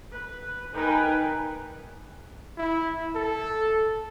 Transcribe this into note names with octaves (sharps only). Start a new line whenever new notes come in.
B4
D#4 A#4 B4 G5 G#5
E4
A4